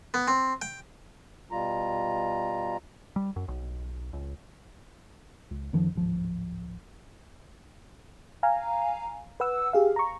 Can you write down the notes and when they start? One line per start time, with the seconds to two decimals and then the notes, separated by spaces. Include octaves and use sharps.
0.14 B3
0.28 C4
0.62 G5
1.51 B2 G3 F4 A#5
3.16 G3
3.36 F#2
3.48 B1
4.13 C#2
5.51 C#2
5.73 F#2 D#3 F3
5.95 D1 G#1 F3
8.43 F5 G#5 A#5
9.40 B4 F#5 E6
9.73 G4 G#4 F5
9.96 A#5 C#6